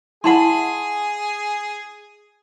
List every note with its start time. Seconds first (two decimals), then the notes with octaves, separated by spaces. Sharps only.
0.24 E4 G#4 F#5 G#5 A5 B5 C6